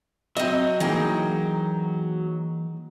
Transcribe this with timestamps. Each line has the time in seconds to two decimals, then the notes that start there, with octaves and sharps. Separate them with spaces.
0.37 F#3 C4 D#5 E5
0.80 E3 A#3 D#4 G#4 G5